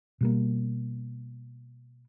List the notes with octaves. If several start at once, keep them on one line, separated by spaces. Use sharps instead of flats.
B2 G3 A#3